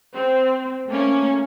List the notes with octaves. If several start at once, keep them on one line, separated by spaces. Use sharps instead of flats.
C4
A3 A#3 C#4